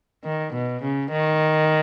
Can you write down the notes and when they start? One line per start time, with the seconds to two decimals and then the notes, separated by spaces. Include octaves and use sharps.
0.24 D#3
0.54 B2
0.83 C#3
1.12 D#3